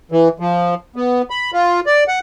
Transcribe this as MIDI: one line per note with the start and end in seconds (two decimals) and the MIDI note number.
0.12 0.28 52
0.40 0.75 53
0.96 1.22 59
1.30 1.51 83
1.53 1.80 65
1.86 2.04 74
2.08 2.19 78